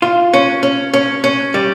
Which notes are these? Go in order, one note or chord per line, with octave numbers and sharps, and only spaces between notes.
F4
C#4
C#4
C#4
C#4
G3